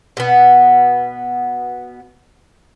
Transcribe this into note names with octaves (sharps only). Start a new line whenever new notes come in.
B2 B3